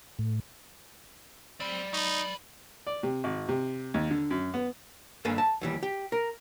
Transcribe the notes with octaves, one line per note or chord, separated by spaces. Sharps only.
A2
C4 D5 B5
F#3 D#4 B4
D5
C3
G#1
C3
D#2
D3
F#2
B3
G2 A#3 A4 B4 G#5
A5
D#2 E3 G3
G4
A#4